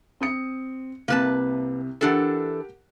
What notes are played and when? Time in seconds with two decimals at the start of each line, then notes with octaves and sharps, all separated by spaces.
0.21 C4 D#6 C#7
1.08 C2 C3 A#3 B4 A5
2.01 E3 D4 G4 A4 A#4 F#5